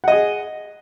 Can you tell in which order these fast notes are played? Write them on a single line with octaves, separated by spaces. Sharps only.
F#5 D#5 G#4